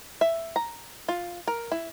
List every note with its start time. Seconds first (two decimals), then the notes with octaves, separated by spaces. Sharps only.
0.21 E5
0.56 A#5
1.08 F4
1.48 A#4
1.72 E4